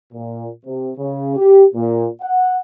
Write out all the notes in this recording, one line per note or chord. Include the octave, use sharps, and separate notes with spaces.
A#2
C3
C#3
G4
A#2
F#5